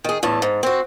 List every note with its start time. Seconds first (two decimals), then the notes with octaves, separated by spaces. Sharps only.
0.04 D#3 G#4
0.23 E2 A2 A5
0.42 G#2
0.63 C4 F#4